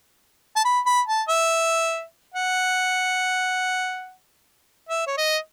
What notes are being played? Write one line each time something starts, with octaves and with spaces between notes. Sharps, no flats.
A5
B5
B5
A5
E5
F#5
E5
C#5
D#5